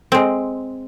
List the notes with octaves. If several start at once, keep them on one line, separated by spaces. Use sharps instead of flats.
G#3 C4